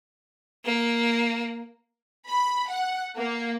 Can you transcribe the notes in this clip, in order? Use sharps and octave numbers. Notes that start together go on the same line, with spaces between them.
A#3
B5
F#5
A#3